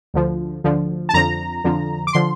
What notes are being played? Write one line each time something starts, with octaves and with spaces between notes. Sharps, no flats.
D2 D3 F3
D2 D3 F3
A5
F2 D3 F3 A#5
F2 D3 F3
D6
D3 F3 C6